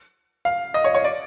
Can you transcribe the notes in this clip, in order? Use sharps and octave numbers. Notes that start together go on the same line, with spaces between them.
F5
D#5
C#5
C#5
D5